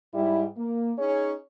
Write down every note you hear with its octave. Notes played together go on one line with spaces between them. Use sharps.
G#2 G3 E4
A#3
C#4 D#4 G#4 C#5